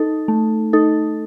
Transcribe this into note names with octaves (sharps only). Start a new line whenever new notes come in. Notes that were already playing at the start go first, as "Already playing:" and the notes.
Already playing: D#4 A4
A3
D#4 A4